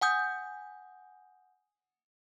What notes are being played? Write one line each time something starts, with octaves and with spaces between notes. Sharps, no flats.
F#5 G#5 D#6 G6